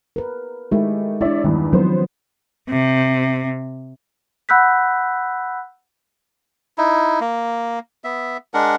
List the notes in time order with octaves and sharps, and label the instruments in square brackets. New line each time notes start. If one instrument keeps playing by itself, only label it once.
[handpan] A#4 B4
[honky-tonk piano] D#3 A3 E4 [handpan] G#3 G4
[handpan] D4 E4 [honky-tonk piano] C#5 D5 E5
[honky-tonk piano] E2 G2 E3 [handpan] D#3
[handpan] F3 F#3 C4 [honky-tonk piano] B3 C5
[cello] C3
[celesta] F#5 B5 E6 F#6 G6 B6
[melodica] D#4 E4
A#3
B3 E5
G#3 D4 A#4 F#5